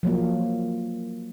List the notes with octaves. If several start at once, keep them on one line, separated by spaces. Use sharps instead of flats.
F3 F#3 A#3